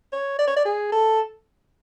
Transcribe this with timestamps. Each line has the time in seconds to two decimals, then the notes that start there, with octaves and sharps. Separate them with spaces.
0.12 C#5
0.39 D5
0.47 C#5
0.56 D5
0.65 G#4
0.92 A4